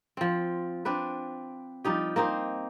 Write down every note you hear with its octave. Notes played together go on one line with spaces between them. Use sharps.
F3 C4
C4 D4 B4
F3 G3 D#4 G4
A#3 C4 D#4 C5